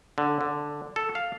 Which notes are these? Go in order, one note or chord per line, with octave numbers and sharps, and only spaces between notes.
D3
D3
A4
F5